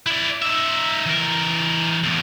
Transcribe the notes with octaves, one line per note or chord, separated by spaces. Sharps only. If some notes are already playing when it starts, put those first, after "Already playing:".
E4 D5
D#4 E5
E3 A#4
E2 A2